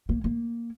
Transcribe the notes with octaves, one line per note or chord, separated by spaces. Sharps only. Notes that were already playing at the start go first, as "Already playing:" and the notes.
A#3
A#3